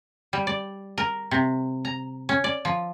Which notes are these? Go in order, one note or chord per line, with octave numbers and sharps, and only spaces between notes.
G3
D5
A#4
C3
A#5
C#4
D5
F3